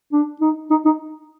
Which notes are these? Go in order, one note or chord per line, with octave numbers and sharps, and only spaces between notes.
D4
D#4
D#4
D#4